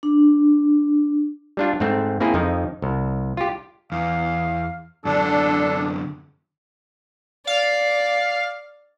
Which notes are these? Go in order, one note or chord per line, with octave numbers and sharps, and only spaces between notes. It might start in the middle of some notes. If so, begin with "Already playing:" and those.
D4
G3 D4 F4
G#2 A3 C4
A#3 C4 E4 G#4
F2 F3 D#4
C2
F4 G4
E2 F5
F#2 D3 D4 A4
D5 F5